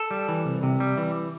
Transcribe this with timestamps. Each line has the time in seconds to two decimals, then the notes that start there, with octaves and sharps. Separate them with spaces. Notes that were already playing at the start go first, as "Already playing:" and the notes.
Already playing: A4
0.11 G3
0.28 E3
0.46 C2
0.63 C3
0.80 G3
0.97 E3